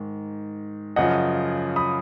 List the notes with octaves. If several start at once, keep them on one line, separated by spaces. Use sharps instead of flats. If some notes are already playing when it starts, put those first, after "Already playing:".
Already playing: G#2 D#3
F#2 C#3 F3 D#5 F#5
B5 D#6